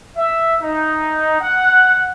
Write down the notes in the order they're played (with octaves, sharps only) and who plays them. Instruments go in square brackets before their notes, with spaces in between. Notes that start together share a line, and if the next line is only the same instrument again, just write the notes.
[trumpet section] E5
D#4
F#5